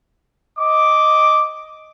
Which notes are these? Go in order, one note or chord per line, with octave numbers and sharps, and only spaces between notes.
D#5 D6